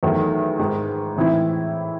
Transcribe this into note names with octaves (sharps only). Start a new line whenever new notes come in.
E2 D#3 F#3 A3
G#2 D#3 G#3
A2 E3 C4 E4